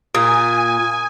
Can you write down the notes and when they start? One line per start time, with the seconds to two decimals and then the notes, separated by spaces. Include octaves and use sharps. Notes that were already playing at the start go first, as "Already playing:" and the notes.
0.15 A#2 G#5 D#6